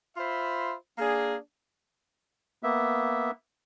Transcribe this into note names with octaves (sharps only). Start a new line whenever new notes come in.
F4 C5 E5 B5
A#3 D4 G#4
A#3 B3 E5